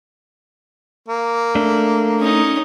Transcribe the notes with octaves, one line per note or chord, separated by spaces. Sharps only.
A#3
A3 D4
C#4 D#4